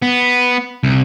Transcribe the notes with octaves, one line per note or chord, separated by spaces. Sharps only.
B3
C2